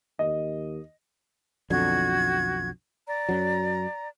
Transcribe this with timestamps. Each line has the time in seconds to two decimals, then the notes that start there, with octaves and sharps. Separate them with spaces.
0.19 D#2 D#5
1.70 B1 F2 D3 F#4 G#6
3.07 D5 A#5
3.29 F#2 F#3